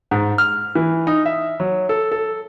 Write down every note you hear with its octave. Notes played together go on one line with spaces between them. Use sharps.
G#2
F6
E3
D#4
E5
F#3
A4
A4